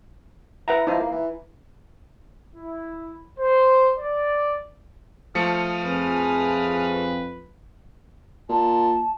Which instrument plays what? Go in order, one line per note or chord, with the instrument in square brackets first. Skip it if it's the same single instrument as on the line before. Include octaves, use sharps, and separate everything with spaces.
[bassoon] E4 [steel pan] B4 F#5 A#5
[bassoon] F3 [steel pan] D#4 E4
[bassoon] A#3
E3
[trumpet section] E4
C5
D5
[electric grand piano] F3 A3 C#7 [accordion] D#6 F6
[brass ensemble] F2 B4 [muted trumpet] G#4
[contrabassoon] A#2 [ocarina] A5